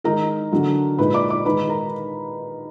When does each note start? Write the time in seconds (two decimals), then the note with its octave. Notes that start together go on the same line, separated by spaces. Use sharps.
0.04 D#3 G#3 D#4 A#4 A#5
0.52 D3 F#3 D4
0.98 A#2 G#3 D#4 B4 B5
1.14 D5 D6
1.30 D5 D6
1.45 D#3 G#3 D#4 B4 B5
1.69 A#4 A#5